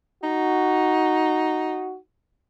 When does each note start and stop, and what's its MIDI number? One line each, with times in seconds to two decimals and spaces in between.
0.23 1.99 63
0.23 1.97 66